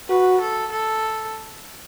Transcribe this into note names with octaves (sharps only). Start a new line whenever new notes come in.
F#4 B4
A4
A4